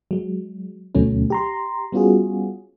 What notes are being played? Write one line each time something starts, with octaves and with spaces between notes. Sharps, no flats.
F#3 G#3
D2 B2 F#3 A3 C#4
G4 A#5 C6
G3 B3 C#4 F4 F#4 G#4